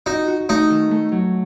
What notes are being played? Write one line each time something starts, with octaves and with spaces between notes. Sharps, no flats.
D#4 F#4
F#4
A3 D#4
D#3
A3
F#3